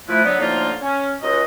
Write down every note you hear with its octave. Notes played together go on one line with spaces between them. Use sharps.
F3 A3 E4 B4
D3 F#3 B3
A2 D3 F3 A#3 D#4 F4
C#4
C#2 F#4 D#5